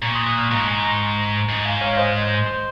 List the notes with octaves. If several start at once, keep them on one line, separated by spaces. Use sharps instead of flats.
A#2 A#5 C#6
C6 D#6
D#6 F#6
C#6 F6
G#2 A#5 C#6
G#5 C6
A#5 C#6
G#2
F5 G#5
C#5 F5
F5
C5 D#5
C5
C5
C5
C5